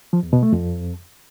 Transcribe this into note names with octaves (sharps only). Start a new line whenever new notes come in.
F3
E2
B2
A3
F2